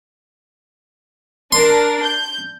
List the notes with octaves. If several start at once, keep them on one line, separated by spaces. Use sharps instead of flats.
D4 A#4 C6
G6